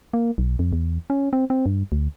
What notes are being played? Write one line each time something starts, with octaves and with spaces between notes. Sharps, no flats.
A#3
B1
F2
E2
C#4
C4
C4
G2
D2